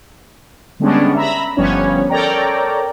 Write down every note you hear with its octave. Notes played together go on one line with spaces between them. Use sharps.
D3 G3 G#3 B3 C#4 D4
E5 A#5 B5
G1 F3 G3 B3 C#4 C#5
A4 A#4 C#5 D5 G5 A#5